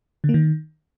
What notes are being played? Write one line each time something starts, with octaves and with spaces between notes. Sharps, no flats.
D3
A#3
D#3